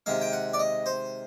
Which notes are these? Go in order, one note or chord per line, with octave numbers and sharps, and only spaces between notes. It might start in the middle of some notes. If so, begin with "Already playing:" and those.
C3 D#3 G#3 F5
G5
F#5
D5
D#5
C5